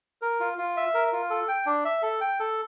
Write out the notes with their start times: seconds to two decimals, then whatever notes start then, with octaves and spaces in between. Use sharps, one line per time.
0.22 A#4
0.40 F4
0.58 F4
0.77 E5
0.94 A#4
1.13 F4
1.30 A4
1.48 G5
1.66 D4
1.85 E5
2.02 A4
2.21 G5
2.40 A4